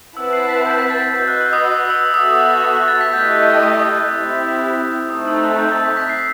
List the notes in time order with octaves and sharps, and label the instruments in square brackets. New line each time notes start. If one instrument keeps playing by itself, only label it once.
[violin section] C4 E4 B4 F#5 A5 [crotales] E6
[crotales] C7
B6
G6
B6
A6
A6
[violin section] F#4 B4 D#5 [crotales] G6
[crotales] F#6
E6
D#6
E6
E6
[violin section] B3 F#4 A4 E5 [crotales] D#6
[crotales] D#6
D#6
F#6
A6
B6
[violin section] A3 E4 G4 D#5 [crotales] G6
[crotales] D#6
D#6
D#6
[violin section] C4 E4 G4
[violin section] A3 C4 D#4 [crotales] D#6
[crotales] E6
F#6
G6
A6
B6
B6
C7